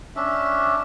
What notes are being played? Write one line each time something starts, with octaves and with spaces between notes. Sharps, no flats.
C#4 D4 E5